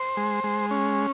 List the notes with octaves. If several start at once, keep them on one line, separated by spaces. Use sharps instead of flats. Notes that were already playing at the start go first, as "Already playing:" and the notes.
Already playing: C5
G#3
G#3
C#4